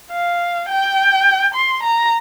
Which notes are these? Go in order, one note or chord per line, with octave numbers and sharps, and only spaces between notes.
F5
G5
C6
A#5